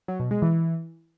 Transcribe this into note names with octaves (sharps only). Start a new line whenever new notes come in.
F#3
B2
G#3
E3